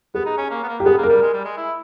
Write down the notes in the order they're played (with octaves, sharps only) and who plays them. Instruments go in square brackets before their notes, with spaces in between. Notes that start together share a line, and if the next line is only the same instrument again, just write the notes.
[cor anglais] B3 [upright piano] G#4
[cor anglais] D#4
C#4
A#3
B3
A#3
[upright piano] G4
[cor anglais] B3 [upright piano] G#4
[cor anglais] A#3
[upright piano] A#4
[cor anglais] G3
G#3
G3
G#3
E4